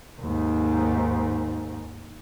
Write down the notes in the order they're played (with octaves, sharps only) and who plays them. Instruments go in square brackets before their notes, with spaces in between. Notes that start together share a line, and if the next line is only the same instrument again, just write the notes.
[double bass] D#2 G#2